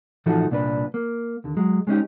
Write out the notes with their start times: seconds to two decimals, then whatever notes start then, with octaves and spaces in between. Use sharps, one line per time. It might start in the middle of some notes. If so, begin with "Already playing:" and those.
0.26 A2 E3 F3 D#4 F#4 A4
0.50 C2 A#2 D4 B4
0.94 A#3
1.44 D#2 D3
1.57 F#3 G#3
1.87 G#3 C#4 D#4 G4